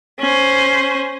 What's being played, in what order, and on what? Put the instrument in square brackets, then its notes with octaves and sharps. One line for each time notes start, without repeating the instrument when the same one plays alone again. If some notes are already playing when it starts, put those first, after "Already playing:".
[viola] C#4 C5